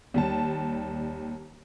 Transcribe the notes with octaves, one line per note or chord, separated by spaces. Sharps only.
D#2 G3 A5